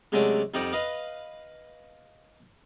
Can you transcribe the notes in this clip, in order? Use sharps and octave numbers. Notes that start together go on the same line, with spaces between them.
C3 F#3 G#3 A3 C#4 D4
F2 G3 D#4 G4 F#5
B4 D#5 F5